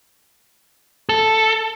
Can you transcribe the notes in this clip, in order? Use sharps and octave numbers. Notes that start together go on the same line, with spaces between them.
A4